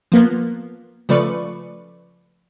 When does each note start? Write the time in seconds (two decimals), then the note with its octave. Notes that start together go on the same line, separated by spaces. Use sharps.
0.12 F3 A#3 B3
1.09 C#3 F3 A3 B4 D5 C#6